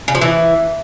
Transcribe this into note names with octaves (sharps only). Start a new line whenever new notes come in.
C#3
F3
E3